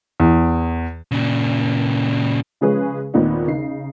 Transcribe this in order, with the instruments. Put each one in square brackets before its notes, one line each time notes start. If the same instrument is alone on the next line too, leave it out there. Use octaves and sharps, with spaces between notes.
[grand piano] E2
[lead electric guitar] A#2 C#3
[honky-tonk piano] C#3 F3 G#3 C#4 G#4 B4
D#2 A#2 B3 C4 D#4
C#3 D#4 C7